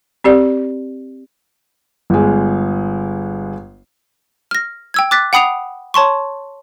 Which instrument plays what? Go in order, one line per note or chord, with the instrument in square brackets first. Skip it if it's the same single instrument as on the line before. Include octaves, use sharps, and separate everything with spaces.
[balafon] C4 G4 D5
[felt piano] G1 G#3
[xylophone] F6 A#6
G5 E6 G#6
D6 F#6 A6 B6
F#5 G5 B5 D#6 C7 F7
C#5 A5 C6 C#6